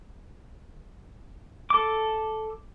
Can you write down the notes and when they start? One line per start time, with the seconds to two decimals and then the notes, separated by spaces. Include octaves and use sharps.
1.70 A4 D6